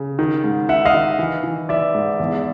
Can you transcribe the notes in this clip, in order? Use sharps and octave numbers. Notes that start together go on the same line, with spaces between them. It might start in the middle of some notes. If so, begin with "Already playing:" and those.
Already playing: C#3
D#3
G#2
D#3 E5 F#5
D#5 F5
D#3
E3
E3
E3 D5 E5
G#2
E2